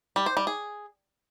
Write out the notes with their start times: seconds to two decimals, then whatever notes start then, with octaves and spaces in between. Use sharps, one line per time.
0.16 G3
0.26 C5
0.37 G3
0.47 G#4